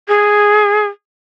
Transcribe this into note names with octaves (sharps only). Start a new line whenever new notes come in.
G#4